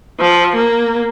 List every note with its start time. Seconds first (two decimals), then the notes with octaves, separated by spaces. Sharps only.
0.20 F3
0.55 A#3